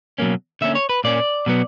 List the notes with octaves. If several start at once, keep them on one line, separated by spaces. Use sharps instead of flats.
B2 F#3 A#3 C#4
D3 A#3 C#4 E5
C#5
B4
A#2 A#3 C#4 D5
B2 F#3 B3